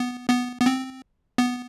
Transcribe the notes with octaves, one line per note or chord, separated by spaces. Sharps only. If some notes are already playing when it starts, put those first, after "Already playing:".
Already playing: B3
B3
B3
C4
B3